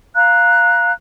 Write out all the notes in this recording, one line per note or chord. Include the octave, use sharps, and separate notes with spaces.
F5 A#5 F#6